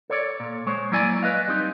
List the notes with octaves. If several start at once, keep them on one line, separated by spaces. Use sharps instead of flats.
A4 C#5 D5
A#2
G#3 C5 C#5
F#3 A#3 E4 D5 G#5
B4 D#5 F5
G3 C4 D#4